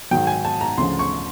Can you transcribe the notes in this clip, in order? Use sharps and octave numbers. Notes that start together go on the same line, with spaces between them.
G#2 D#3 F#3 G5
G#5
A5
A#5
D2 C#3 F3 C6
C#6